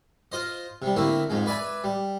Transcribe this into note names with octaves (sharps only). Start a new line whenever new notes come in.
F4 C5 D#5
C3 G3
D3 A3 A#3 C4 E4
F2 G#2 G#3
B4 D5 E5 G#5 B5
G3